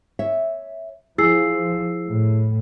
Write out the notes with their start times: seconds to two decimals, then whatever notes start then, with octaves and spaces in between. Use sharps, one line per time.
0.19 C#5 E5
1.18 F3 E4 G#4 E6 C7
2.08 A2